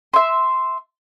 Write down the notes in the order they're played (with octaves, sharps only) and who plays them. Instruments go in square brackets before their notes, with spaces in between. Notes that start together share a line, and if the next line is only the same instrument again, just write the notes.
[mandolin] E5 C6